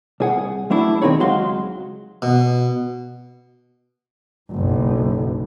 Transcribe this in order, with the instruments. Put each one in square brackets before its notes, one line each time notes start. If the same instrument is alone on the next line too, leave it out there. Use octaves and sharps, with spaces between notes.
[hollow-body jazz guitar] C2 G#4 F#5
F#3 A3 D4 E4
D#3 C4 D#4 G#4 C#5
C#2 F#3 G#3 F#4 F5 C6
[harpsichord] B2
[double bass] F#1 B1